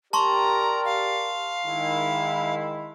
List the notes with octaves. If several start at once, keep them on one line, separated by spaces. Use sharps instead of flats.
G4 A#4 D5 A5 A#5 C6 C#6
F5
D#3 G#3 E4